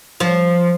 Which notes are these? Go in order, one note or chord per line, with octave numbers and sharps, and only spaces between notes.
F3